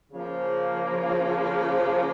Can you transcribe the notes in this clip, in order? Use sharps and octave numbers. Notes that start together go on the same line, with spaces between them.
C#3 F3 A#3